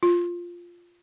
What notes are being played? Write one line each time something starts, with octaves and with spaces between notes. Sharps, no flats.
F4